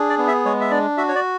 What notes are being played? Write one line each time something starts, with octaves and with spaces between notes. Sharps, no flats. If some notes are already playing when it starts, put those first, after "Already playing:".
Already playing: D4 G#4
D5
B3
E5
G#3 C#5
E5
D4 D5
F#4 E5
C#5
D5